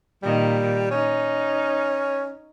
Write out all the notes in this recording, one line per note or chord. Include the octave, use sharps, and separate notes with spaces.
A#2 D#3 G3
C#4 D#4